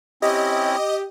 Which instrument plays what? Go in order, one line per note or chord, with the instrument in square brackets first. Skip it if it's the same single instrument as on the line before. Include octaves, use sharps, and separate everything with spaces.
[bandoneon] C4 C#4 E4 [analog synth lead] G4 [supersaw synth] D#5